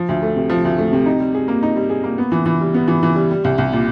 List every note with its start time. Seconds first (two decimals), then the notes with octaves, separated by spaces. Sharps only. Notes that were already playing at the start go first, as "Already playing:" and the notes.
Already playing: F3
0.09 D2
0.22 A3
0.36 C3
0.50 F3
0.65 D2
0.78 A3
0.93 C3
1.06 D#4
1.20 G3
1.34 G#4
1.48 A#3
1.63 D#4
1.76 G3
1.90 G#4
2.04 A#3
2.18 B3
2.32 E3
2.46 E3
2.61 G3
2.74 B3
2.88 E3
3.03 E3
3.16 G3
3.31 G3
3.44 C2
3.58 C2
3.73 A#2